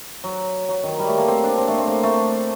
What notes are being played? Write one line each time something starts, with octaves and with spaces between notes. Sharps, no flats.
F#3
F#3
D#3
G3
A3
A#3
C4
D4
C4
A3
C4
A#3
A3